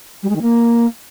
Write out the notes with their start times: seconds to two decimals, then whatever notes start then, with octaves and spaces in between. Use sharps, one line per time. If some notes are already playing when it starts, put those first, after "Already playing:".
0.22 G3
0.28 G#3
0.35 D#3
0.41 A#3